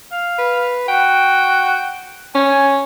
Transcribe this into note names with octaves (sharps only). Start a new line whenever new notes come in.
F5
B4
F#4 G5
C#4 G#5